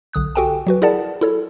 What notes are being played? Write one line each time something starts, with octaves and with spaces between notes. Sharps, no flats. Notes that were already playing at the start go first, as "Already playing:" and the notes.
B1 D3 D#6 F#6
F#4 G4 A4 G5 G#5
F#3 F#4 B4
E4 G#4 A#4 D5 F#5 A5
E4 A4 C#5